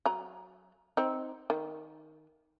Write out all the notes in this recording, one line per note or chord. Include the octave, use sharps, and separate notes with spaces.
F#3 A#5
C4 D#4
D#3